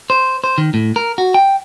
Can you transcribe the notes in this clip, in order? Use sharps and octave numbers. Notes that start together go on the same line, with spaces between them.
C5
C5
D#3
A2
A#4
F#4
G5